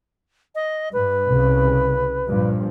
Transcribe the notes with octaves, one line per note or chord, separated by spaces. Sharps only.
D#5
G2 B4
C2 C#3
G2 A#2 F3